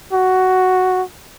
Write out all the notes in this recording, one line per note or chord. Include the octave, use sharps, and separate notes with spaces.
F#4